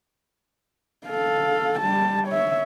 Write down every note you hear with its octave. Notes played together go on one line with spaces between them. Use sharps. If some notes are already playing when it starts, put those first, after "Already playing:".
A4 F5
G3 A5
C#5 E5